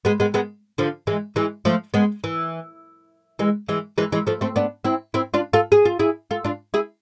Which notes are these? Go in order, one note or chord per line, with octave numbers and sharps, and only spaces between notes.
G#3 B3
G#3 B3
G#3 B3
D3 F3
E3 G#3
E3 G#3
F3 A3
G#3 B3
E3
E3 G#3
E3 G#3
E3 G#3
E3 G#3
F3 A3
A3 C4
B3 D4
C4 E4
C4 E4
D4 F4
F4 A4
G#4
F4
E4 G#4
F4 A4
D4 F4
E4 G#4